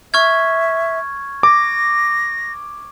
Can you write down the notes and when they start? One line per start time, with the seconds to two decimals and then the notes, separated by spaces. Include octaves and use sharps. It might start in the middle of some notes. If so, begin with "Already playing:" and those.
0.14 E5 C#6 F6 G#6
1.43 D6 A#6